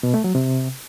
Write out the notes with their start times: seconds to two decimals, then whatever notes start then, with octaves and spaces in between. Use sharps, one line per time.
0.03 B2
0.14 A3
0.24 F#3
0.35 C3